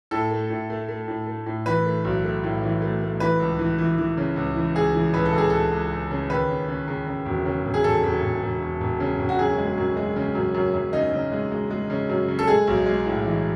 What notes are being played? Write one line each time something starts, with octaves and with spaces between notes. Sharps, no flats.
A2 A4
A3
A2
A3
A3
A2
A3
A2
E3 B4
A3
B1
A3
A2
E3
A3
A3
E3 B4
C#2
E3
E3
E3
C#3
C#2
E3
C#2 G#4
E3
C#2 B4
A4
C#2
G#4
C#2 A4
C#2
C#2
C#3
D#2 B4
C#3
C#3
C#3
C#3
E1
C#3
E1
G#4
E1 A4
E1
E1
E1
E1
E1
C#3
E1
F#4
F#2 G#4
G#3
F#2
G#3
C#3
F#2
F#2
F#2
C#3 D#4
C#3
G#3
G#3
G#3
C#3
F#2
C#3
A4
G#3 G#4
B1
G#3
A2
E3